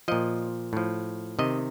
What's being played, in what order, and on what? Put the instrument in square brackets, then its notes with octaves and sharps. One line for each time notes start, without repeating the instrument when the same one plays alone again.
[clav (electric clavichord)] A#2 F3 D#5
A2 F3
C3 D#3 D#5